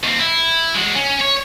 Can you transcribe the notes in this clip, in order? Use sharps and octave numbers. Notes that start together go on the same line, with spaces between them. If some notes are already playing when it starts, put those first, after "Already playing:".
D#2 C4
E4
G#3 F#4
C#4
C#5